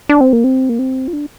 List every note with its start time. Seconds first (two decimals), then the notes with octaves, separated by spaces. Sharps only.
0.09 D4
0.21 C4
0.33 A#3
0.44 C4
0.69 A#3
0.79 C4
1.08 F4
1.13 D4